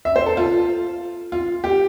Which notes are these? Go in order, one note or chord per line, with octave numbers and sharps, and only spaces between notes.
E5
C5
A4
F4
F4
G4